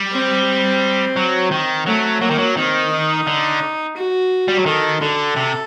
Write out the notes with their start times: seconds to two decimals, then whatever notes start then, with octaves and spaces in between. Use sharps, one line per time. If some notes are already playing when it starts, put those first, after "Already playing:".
Already playing: G3
0.12 C4
1.17 F#3
1.51 D#3
1.86 F#3 A3
2.21 F#3 A#3
2.30 D#3
2.38 F#3
2.56 D#3 C4
2.92 D#4
3.27 D3
3.97 F#4
4.48 G3
4.57 F#3
4.66 D#3 A4
5.02 D3 A4
5.36 C3